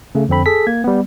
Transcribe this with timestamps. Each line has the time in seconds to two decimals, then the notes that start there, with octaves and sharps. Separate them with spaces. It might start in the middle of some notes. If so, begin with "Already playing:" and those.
0.15 C#3 A3
0.29 F2 D3 C4 B5
0.46 G#4 A4 B6
0.67 A#3 G#6
0.84 G3 B3